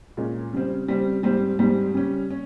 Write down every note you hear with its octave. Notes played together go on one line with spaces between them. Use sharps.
A#2 G#3 C#4
C#3 G3 C4
C#3 G3 C4
G#2 G3 C4
G#2 G3 C4
C#3 G3 C#4
C#4